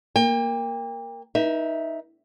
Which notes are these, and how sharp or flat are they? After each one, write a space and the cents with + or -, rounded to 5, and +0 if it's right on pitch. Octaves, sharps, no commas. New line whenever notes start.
A#3 +0 G5 +35
D#4 +10 B4 -40 E5 +0